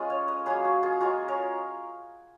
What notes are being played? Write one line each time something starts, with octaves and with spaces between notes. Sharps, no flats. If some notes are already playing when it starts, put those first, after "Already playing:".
Already playing: G#3 C#4 F4 B4 D#5
C#5 F5
B4 D#5
F#3 A#3 C#4 G#4 B4
F#4
F4 G#4
G#3 C#4 F4 F#4 A#4
A#4 C#5